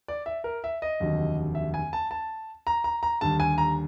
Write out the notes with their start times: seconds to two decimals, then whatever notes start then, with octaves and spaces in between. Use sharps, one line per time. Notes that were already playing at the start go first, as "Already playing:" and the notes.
0.08 D5
0.26 E5
0.44 A#4
0.64 E5
0.82 D#5
1.00 F1 D#2 D3 F#3
1.55 E5
1.74 G#5
1.93 A5
2.11 A5
2.67 A#5
2.84 A#5
3.03 A#5
3.21 D#2 D3 G3 A5
3.40 G#5
3.58 A#5